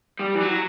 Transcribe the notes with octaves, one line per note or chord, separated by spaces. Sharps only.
G3
E3
F#3